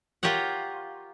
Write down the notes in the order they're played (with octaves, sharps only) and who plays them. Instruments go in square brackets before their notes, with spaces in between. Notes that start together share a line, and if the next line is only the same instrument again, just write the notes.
[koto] F4 G4 A#4 C#5 F#5